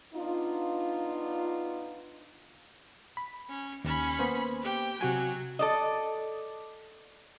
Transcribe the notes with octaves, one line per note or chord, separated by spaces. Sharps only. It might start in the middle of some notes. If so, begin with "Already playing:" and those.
B3 D4 D#4 F4
B5
C#4
D#2 C#4 B5
A#3 B3 C5
G4 G5
C3 F#3 F#4 G#5
A4 D5 D#5